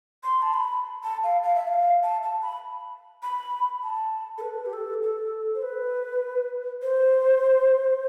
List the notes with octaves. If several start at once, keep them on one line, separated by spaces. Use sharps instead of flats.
C6
A5
B5
A5
F5
F5
E5
F5
A5
A5
B5
B5
A5
A4
B4
G4
A4
A4
C5
B4
C5